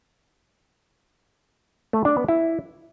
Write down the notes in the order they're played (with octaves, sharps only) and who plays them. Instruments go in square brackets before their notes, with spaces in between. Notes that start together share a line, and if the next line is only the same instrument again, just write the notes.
[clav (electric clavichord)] A3
D4
B3
E4